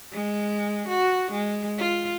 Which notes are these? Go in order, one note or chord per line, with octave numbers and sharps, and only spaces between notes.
G#3
F#4
G#3
F4